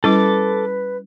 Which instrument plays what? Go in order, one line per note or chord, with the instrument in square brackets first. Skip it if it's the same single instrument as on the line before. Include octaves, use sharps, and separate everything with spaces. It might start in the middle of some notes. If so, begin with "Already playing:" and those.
[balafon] G3 C#4 E4 [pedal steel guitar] A4 D6 [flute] B4